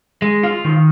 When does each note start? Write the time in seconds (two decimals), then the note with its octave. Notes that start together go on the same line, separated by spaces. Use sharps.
0.22 G#3
0.43 F4
0.64 D#3